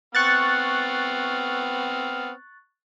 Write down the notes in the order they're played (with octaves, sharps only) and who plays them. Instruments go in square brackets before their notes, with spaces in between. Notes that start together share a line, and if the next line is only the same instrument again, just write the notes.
[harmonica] B3 C4 F6 [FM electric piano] C#6 F#6 A6